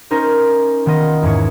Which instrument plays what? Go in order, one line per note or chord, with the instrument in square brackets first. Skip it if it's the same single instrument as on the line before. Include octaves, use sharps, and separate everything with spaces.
[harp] C#4 D#4 A#4 C5
D#3 B3 F4 D#5
E2 G#2 C#5